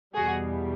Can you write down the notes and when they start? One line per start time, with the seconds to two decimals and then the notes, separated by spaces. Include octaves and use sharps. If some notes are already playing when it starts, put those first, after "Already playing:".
0.15 E2 B2 G3 F#4 G#4